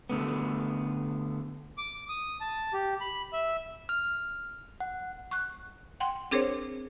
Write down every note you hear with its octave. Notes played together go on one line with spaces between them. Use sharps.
D3 A3 B3
D6
D#6
A5
G4
B5
E5
F6
F#5
C#6 F#6
F#5 G5 C6
C4 D4 G#4 A#4 C5 C#5